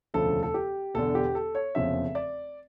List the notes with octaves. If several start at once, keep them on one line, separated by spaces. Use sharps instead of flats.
E1 D2 C#3 F3 A4
A4
G4
E1 E2 D3 A4
G4
A4
C#5
F1 E2 C#3 F3 C#4 E5
D5